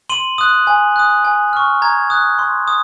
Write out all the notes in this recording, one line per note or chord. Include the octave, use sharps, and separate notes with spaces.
C6 D#7 F#7
D#6 F#6
G#5
D#6 F#6
G#5
C#6 F6
A#5 G#6
D#6 F#6
C6
D#6